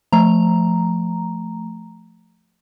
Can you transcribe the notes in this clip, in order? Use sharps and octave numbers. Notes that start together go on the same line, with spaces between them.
F3 A3 A#5